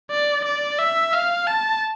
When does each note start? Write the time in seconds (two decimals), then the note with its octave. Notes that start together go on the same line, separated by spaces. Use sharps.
0.11 D5
0.45 D5
0.79 E5
1.13 F5
1.47 A5